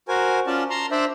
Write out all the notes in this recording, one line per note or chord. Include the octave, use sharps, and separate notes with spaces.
F#4 A#4 C5 G#5
C#4 F4 D5 A5
A5 A#5 C6
D4 C5 D5 E5